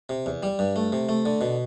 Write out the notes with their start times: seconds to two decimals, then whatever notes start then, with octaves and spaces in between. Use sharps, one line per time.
0.09 C3
0.26 E2
0.43 G3
0.59 G2
0.76 A3
0.92 C3
1.09 A3
1.26 D3
1.41 B2